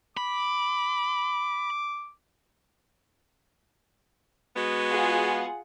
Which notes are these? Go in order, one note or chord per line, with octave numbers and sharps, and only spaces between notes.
B5 D6
G#3 B3 F#4
F4 G#4 F#5